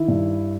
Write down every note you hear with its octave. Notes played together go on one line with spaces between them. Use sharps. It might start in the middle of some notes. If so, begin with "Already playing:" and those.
Already playing: D#3 E4
G2